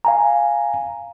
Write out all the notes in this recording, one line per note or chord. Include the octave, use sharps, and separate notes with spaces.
F5 G#5 A#5